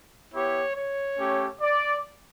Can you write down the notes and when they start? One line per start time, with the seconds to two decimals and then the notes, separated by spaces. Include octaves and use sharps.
0.33 B3 E4 G4 C#5
0.75 C#5
1.18 A3 C#4 G4
1.61 D5